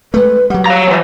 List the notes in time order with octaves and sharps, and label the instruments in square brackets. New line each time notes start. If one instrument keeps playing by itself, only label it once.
[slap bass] G#3 A3 [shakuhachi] B4
[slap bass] F#3 G3 [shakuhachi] F#5
[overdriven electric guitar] C#5 A#5 [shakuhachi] F5
[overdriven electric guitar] E3 F3 [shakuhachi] F#5